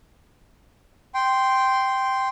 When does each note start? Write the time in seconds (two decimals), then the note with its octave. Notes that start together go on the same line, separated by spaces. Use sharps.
1.14 G5 C6